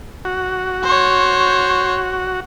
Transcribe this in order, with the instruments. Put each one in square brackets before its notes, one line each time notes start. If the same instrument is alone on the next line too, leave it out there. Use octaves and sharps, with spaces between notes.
[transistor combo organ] F#4
[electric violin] C5 C#5